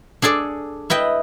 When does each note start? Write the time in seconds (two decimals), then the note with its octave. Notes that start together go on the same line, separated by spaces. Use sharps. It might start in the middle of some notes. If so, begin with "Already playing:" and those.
0.22 D4 G#4 A4 D5
0.90 E4 B4 D#5 G5